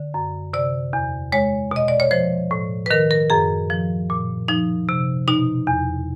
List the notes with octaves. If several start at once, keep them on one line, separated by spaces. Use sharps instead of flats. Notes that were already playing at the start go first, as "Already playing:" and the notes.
Already playing: D3
F#2
C3 D5
E2
G#3 C#5
B2 D#5
D5
C#5
F3 C5
A2
B4
D#3 A#4
A#4
F#2 G#4
F3
A#2
F3 D#4
C3
B2 D#4
E2